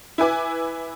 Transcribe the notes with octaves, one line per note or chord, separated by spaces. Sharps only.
E4 B4 G#5 D6